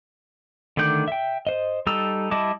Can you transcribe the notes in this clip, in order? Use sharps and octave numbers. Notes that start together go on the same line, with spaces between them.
D3 D#3 A3 D5 G6
E5 G5
C5 D#5
G3 D#4 A4 A#5 E6
G3 E4 D#5 A5 D6